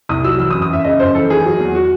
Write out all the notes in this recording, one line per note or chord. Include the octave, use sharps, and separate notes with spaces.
C2 D#6
F#3 E6
E3 E6
D#6
F#2
D#6
F#2 E5
C#3 D#5
F#2 C5
E3 A4
D#3 G#4
F#3
E2
F#4